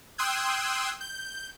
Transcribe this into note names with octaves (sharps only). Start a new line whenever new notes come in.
G5 C6 D#6 E6 F#6 G#6
G6